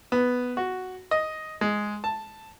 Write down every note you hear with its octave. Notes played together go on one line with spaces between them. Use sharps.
B3
F#4
D#5
G#3
A5